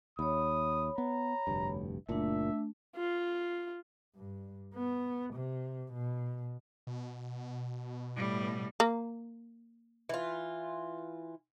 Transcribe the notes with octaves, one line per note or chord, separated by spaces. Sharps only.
D#2 C#5 B5 D#6
B3 A#5
F1 D2 G2
F#1 A#2 A3 D4 E5
F4
G2
B3
C3
B2
B2
A2 G3
A#3
E3 F4